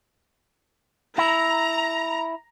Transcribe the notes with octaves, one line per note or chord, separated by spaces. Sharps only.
E4 A#5